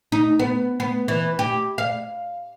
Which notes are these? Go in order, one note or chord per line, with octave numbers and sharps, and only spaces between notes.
D#4
B3
B3
E3
G4
F5